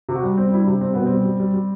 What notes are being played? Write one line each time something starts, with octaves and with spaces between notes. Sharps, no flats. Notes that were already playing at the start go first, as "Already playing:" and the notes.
C3
F#4
G3
G3 C4
G3 E4
D4
C3
G3 C4
B2 B3
G3 C4
G3
G3
G3